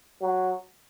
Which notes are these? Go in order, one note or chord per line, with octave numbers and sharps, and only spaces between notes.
F#3